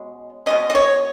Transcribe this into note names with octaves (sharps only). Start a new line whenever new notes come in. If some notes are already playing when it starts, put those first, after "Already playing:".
Already playing: B2 G#3 C#4
B2 G#3 C#4 D#5
D#5
C#5